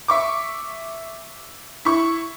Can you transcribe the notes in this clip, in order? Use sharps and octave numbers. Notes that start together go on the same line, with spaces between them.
E5 C#6 D6
E4 C#6